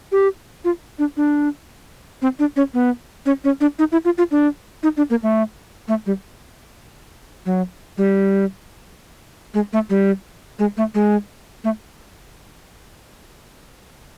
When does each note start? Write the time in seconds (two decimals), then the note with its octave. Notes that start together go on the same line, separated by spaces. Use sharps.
0.12 G4
0.65 F4
0.99 D4
1.17 D4
2.22 C4
2.39 D4
2.56 C#4
2.74 B3
3.26 C#4
3.44 C#4
3.61 D4
3.79 D#4
3.92 E4
4.05 F4
4.18 F4
4.31 D4
4.83 D#4
4.97 D4
5.10 A#3
5.23 A3
5.88 A3
6.06 G3
7.46 F#3
7.98 G3
9.54 G#3
9.73 A3
9.90 G3
10.59 G#3
10.77 A3
10.95 G#3
11.64 A3